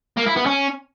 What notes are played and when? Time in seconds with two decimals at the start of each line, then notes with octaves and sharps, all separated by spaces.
0.17 A#3
0.26 E4
0.36 B3
0.46 C#4